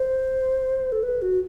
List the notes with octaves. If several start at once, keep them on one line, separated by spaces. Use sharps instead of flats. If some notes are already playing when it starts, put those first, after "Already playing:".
Already playing: C5
A4
B4
F#4